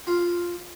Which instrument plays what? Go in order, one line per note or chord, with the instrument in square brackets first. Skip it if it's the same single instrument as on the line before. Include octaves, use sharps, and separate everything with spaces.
[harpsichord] F4